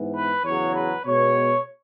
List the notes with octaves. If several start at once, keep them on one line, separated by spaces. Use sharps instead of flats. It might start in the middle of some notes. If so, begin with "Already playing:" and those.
Already playing: G#2 E3 B3
B4
E2 C#3 F#3 C#5
B4
B2 G#3 B3 C#5